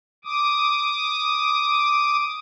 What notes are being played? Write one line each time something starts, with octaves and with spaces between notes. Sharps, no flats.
D6 D#6